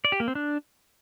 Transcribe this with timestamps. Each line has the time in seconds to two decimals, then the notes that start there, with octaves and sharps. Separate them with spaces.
0.05 D5
0.12 G4
0.20 A#3
0.28 C4
0.35 D4